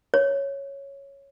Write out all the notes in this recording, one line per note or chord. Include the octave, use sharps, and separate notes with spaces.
C#5